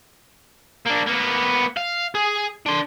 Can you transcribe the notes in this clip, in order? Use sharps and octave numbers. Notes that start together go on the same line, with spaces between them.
A#3 D4
A#3 B3
F5
G#4
D4 C6